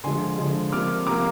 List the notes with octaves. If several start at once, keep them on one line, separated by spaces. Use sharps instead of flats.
D3 F3 G#3 G#5 C6
D3 F3 G#3
C3 F3 A#3 D6 F6
C3 F3 A#3 A#5 D6